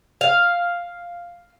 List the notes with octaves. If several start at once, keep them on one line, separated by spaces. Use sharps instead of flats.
F5